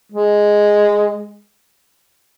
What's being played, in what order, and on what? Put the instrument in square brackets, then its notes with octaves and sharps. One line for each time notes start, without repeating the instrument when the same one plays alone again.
[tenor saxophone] G#3